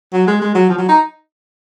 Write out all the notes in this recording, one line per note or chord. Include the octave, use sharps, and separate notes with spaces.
F#3
G#3
G#3
F#3
F3
F#3
D#4